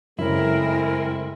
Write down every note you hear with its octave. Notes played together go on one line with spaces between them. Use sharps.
F#2 C#3 G#3 A3 C4 E4 A#4